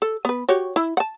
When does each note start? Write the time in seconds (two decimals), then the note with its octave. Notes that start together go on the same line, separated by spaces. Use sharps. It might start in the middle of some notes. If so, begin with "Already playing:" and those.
0.02 A4
0.25 B3 B4
0.49 F#4 G4 C#5
0.76 E4
0.97 F#5 A5